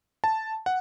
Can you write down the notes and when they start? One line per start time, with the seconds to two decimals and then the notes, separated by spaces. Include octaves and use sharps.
0.24 A5
0.66 F#5